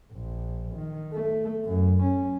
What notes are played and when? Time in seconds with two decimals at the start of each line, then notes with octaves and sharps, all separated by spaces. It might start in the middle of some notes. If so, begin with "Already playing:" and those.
0.12 A#1
0.76 D#3
1.13 A3
1.65 F#2
2.03 C#4